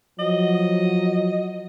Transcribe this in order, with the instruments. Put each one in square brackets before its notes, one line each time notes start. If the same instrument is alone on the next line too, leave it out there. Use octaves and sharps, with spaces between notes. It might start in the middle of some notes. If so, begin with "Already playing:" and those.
[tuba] F3 [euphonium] F#3 [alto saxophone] D#5